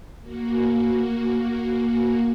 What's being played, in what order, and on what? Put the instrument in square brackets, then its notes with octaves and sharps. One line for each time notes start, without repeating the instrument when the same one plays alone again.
[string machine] A#3 F#4